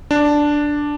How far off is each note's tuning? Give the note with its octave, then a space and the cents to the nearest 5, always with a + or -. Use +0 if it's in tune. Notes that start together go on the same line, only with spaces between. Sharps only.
D4 +0